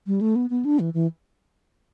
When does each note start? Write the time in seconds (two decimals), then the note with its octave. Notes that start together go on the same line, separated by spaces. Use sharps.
0.07 G3
0.21 A3
0.36 B3
0.50 B3
0.65 D4
0.80 E3
0.94 E3